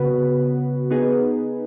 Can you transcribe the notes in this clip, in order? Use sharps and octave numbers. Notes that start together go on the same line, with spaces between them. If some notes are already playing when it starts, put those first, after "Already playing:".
Already playing: C#3 B3 F#4 B4
B3 D#4 G#4 B4